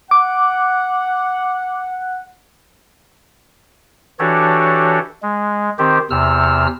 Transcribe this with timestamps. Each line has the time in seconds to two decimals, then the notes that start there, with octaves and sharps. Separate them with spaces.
0.11 F#5 D6
4.19 E3 D4 F#4 G4 A4 C#5
5.22 G#3
5.79 D#3 C4 G4 C5
6.10 E2 C3 E6 F6